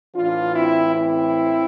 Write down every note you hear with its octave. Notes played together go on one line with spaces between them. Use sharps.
A2 E3 D4 F4
C4 E4
C4 E4